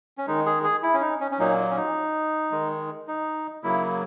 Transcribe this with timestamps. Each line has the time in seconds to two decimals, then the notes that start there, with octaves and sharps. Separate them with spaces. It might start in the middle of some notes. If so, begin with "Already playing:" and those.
0.18 C#4
0.27 D#3 G#3 D#4
0.46 G#4
0.64 G#4
0.83 E4
0.94 C#4
1.01 D#4
1.20 C#4
1.31 C#4
1.39 A#2 F#3 A#3 D#4
1.71 C#4
1.76 D#4
2.51 D#3 G#3
3.08 D#4
3.63 C#3 F#3 A#3 E4